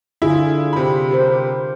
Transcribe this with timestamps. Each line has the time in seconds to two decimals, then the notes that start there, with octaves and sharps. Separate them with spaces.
0.22 D3 E4 F4 G#4
0.73 C3 B5
1.11 G4 A#4 C5